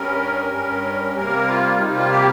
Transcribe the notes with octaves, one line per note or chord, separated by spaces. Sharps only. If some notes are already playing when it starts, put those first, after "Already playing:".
Already playing: G2 G3 C#4 A#4
G2 G3 C#4
C3 G3 A#3 A#4
F4
C3 G3 A#3 D#4
F4
G4